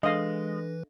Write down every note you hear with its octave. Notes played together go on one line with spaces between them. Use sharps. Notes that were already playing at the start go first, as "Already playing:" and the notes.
E3 G#3 D4 A4 B4 D#5 F5 A#6